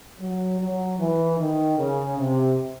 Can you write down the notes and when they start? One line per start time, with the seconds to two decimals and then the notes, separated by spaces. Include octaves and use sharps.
0.19 F#3
0.59 F#3
0.99 E3
1.38 D#3
1.78 C#3
2.18 C3